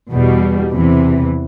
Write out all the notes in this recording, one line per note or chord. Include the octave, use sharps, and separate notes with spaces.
E2 B2 G3
E2 C3 E3